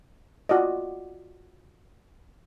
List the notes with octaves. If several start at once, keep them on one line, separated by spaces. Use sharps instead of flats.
F4 F#4 D5 D#5